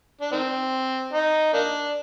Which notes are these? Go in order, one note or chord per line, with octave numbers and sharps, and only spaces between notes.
D4
D#3 C4
D#4
A#3 D4